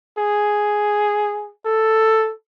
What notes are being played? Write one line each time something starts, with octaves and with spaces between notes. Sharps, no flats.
G#4
A4